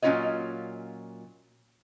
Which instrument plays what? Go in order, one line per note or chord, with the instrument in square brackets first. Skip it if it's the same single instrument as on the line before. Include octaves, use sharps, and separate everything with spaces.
[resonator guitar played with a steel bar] A#2 F#3 C#4 F4 C#5 D#5